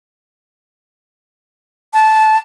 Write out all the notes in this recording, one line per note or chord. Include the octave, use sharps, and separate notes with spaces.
A5